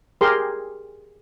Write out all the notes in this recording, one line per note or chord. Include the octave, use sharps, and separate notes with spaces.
G4 G#4 A#4 C6